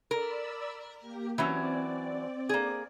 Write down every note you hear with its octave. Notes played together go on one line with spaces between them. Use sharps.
A#4 D5 B5 E6
A#3 G4
E3 F#3 C4 C#4 D5
A#3 G#4